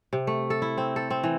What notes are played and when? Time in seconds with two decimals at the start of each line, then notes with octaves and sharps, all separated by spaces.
0.13 C3
0.27 A3
0.50 A4
0.62 E4
0.78 C4
0.96 A4
1.10 C4
1.23 E3